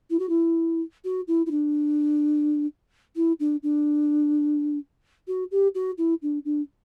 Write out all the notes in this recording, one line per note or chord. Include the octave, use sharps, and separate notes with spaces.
E4
F#4
E4
F#4
E4
E4
D4
E4
D4
D4
F#4
G4
F#4
E4
D4
D4